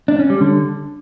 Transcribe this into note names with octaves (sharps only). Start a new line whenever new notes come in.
D4
C#4
G3
D3